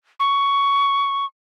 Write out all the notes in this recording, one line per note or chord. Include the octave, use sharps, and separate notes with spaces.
C#6